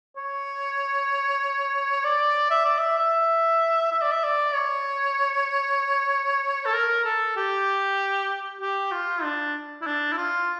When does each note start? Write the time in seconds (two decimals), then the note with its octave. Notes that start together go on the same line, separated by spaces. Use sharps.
0.17 C#5
2.04 D5
2.51 E5
2.65 D5
2.79 E5
2.98 E5
3.91 E5
4.02 D5
4.12 E5
4.24 D5
4.54 C#5
6.66 A4
6.73 A#4
7.04 A4
7.36 G4
8.61 G4
8.92 F4
9.23 D4
9.81 E4
9.87 D4
10.12 E4
10.17 F4